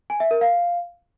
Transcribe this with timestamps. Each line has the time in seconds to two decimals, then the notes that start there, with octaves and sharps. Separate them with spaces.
0.10 G#5
0.20 E5
0.31 A#4
0.41 F5